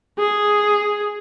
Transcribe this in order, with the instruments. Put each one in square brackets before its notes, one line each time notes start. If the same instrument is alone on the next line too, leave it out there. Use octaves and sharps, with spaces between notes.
[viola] G#4